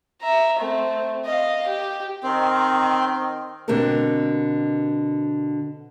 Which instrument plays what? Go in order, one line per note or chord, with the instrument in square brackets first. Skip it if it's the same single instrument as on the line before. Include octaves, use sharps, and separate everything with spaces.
[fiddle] E5 A#5
A3 C4
D#5 F5
G4
[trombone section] D#3 [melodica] C4
[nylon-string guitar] B2 D3 C4 G4 A4 A#4